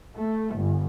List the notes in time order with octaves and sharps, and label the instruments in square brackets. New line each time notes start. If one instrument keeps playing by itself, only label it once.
[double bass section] A3
G1